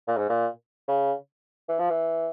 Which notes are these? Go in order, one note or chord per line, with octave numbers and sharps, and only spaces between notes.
A#2
G#2
A#2
C#3
E3
F3
E3